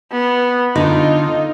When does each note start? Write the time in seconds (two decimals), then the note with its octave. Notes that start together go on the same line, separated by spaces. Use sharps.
0.12 B3
0.76 D3 D#4 F4